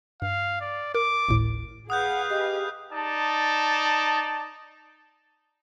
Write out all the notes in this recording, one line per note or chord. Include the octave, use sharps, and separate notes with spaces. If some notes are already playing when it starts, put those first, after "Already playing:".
G2 F5
D5
A#4 D6
G#1 D2 A2
G#4 B4 F5 F#5 D#6 F#6 G6
G4 D#5
D#4 D5 A5